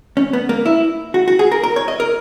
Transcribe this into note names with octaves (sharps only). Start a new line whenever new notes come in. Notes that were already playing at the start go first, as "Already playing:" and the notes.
C#4
B3
A#3
E4
F#4
F#4
G#4
A#4
A#4
C#5
D#5
A#4